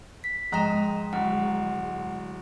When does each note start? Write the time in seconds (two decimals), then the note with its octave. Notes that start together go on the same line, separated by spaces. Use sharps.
0.24 B6
0.52 G#2 F3 D#5 G5 A#5 F#6 E7
1.13 D1 F#5